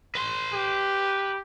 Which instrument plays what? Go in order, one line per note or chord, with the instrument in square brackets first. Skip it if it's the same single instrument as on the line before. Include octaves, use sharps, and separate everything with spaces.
[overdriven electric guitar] B4 C6
[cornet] G4